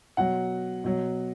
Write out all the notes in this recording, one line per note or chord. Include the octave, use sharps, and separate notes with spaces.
B2 F#3 F#5
B2 F#3